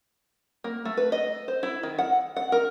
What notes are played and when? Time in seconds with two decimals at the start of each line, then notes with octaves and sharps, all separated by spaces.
0.64 A#3
0.85 A3
0.97 B4
1.12 D#5
1.48 C5
1.63 E4
1.83 D#3
1.98 F#5
2.36 F#5
2.52 A#4